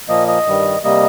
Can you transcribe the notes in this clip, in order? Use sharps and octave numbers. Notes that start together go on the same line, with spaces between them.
A#2 F3 A#3 D#5
D#5
G2 D#3 G3
C3 G3 A#3 D#5